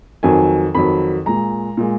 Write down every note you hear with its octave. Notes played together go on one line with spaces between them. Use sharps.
F2 D#3 F#3 G#5
F2 D#3 F#3 B5
A#2 G#3 A#5
A#2 G#3